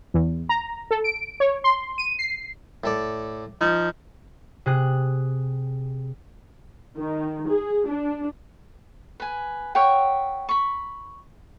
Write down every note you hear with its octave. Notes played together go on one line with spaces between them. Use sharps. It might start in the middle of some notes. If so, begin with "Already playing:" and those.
E2
A#5
A4
D7
C#5
C6
D#7
C7
A2 A4 D5
F3 D#4
C3 G#4 F#6
D#3
G#4
D4
B4 G#5
C#5 E5 F#5 G5
B5 C#6